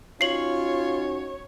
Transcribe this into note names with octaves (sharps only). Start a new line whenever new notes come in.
C#4 D#4 F4 F#4 C#5 C7 F#7